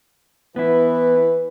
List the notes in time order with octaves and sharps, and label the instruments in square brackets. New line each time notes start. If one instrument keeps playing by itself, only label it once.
[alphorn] E3 [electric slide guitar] B3 E4 [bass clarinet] B4